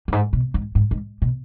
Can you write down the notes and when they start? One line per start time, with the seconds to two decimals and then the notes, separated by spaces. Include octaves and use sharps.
0.08 G2
0.12 G#2
0.33 B2
0.54 G#2
0.75 G#2
0.91 G#2
1.22 B2